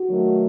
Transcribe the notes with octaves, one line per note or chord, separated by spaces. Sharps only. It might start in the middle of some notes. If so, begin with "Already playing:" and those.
Already playing: F#4
D#3 F#3 A3